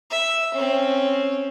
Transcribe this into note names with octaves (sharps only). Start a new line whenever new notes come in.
E5
C4 C#4